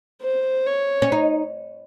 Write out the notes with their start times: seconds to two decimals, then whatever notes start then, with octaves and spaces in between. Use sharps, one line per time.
0.22 C5
0.67 C#5
1.02 C#4
1.12 D#4